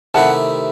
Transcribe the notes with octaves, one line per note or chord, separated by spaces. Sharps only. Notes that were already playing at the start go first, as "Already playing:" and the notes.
C3 D#3 A3 E4 G4 F#5 A5